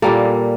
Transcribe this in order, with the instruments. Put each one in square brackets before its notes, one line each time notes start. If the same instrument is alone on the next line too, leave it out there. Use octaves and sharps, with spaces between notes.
[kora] A#2 G3 A#3 A4